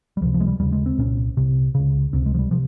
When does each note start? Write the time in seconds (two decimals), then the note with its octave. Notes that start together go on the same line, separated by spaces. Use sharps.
0.17 G3
0.21 C#2 F3
0.25 C3
0.34 F3
0.40 G#3
0.47 G3
0.59 D#2 C#3 G3
0.72 G#3
0.86 C4
0.98 C2 A#2 C#4
1.37 C2 C3
1.75 C#2 C#3
2.13 C#2 C3 C4
2.26 G#3
2.34 F3
2.39 G3
2.51 C3 F3